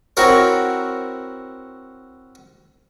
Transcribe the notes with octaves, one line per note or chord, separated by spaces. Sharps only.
C4 E4 F#4 A#4 C#5